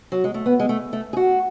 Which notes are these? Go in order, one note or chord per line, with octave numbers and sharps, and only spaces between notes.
F#3
G#3
A3
B3
G#3
A3
A3
G#4
F#4